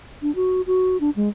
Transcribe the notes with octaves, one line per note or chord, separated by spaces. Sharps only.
D4
F#4
F#4
D4
G#3